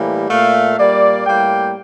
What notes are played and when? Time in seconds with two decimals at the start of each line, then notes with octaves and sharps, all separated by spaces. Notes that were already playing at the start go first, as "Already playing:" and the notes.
Already playing: A2 E3 G3 A#3
0.29 A#2 A3 F5
0.77 A#2 G3 A#3 D5
1.26 A2 G3 A#3 G5